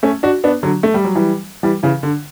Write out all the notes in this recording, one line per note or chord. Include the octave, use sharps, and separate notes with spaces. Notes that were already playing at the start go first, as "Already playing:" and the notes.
A3 C#4
D4 F#4
B3 D4
D3 F#3
A3
G3
F#3
E3 G3
E3 G3
C#3 E3
D3